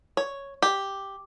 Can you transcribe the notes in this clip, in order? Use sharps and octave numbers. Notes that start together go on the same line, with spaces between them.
C#5
G4